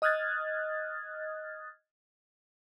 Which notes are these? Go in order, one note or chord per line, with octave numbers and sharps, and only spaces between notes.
D#5 D#6 F6 F#6 G#6 A6